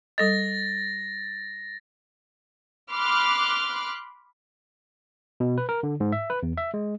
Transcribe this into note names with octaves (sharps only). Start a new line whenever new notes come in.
G3 A4 D#5 A6 A#6
B5 C6 D6 F6 F#6
B2
B4
A#4
D3
G#2
E5
B4
E2
E5
G#3